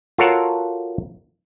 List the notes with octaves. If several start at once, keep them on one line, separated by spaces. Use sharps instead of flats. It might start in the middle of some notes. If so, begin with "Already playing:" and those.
F4 F#4 A4 A#4 C#5 F#5